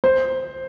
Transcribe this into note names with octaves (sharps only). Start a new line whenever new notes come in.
C5